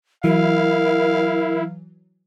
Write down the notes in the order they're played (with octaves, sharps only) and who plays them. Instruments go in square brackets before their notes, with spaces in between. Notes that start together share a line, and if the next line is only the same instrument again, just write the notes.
[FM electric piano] E3 F#3 [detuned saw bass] E4 [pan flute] A#4 [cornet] F5